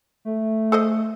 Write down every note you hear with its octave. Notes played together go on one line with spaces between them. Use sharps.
A3
A4 C5 D#5